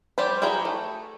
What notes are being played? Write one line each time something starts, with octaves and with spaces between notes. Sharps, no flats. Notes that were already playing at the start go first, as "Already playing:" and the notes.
G3 G4 C5 D5 B5
E4 F#4 G#4 G5 A#5
A3